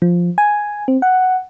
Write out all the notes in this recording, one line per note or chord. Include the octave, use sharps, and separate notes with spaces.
F3
G#5
C4
F#5